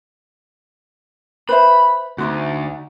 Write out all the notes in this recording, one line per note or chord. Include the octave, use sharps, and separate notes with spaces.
B4 C5 E5 B5
D2 D#4 F4 F#4